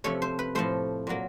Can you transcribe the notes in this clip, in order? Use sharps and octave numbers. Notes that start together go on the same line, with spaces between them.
C3 F3 A3 C#5
C5
B4
A2 F3 A3 C5
A#2 F#3 A#3